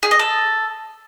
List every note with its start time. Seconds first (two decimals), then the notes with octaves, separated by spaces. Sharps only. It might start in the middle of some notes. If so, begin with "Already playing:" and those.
0.03 G#4
0.11 D#5
0.19 A4